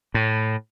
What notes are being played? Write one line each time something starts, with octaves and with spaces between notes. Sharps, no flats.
A2